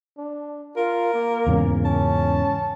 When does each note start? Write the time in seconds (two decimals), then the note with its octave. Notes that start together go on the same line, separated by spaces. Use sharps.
0.18 D4
0.76 F4 A#4
1.14 A#3
1.47 E2 G#2 C#3
1.85 C#4 A5